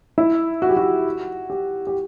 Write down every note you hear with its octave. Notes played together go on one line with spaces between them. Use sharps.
E4
F#4
G4
F#4
G4
G4